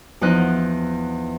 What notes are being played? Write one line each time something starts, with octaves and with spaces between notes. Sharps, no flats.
E2 F3 D#4 F#6